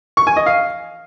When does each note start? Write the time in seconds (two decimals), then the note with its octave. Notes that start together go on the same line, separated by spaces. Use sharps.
0.17 C#6
0.27 G#5
0.37 D#5
0.46 F5